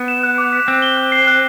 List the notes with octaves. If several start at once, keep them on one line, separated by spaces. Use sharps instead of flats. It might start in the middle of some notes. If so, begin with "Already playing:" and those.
Already playing: B3
E7
F#6
D6
B6
C4 F#6
G7
F#6
C7
F#6